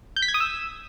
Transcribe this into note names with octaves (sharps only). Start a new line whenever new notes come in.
G6
B6
G#6
D#6
E6